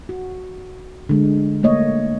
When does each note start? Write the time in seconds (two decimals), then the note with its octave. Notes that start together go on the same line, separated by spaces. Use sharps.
0.09 F#4
1.09 D3 G#3
1.63 A3 A#3 C#5 D#5